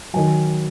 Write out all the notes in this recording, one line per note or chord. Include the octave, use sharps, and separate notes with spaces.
D#3 F#3 G#5